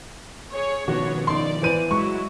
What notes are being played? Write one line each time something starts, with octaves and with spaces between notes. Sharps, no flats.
G#4 C#5
B2 D#3 F3 B3 D4 F#4 C#5
D#4 D5 C6
E3 C5 D#7
F#3 G#3 E4 F#4 C#6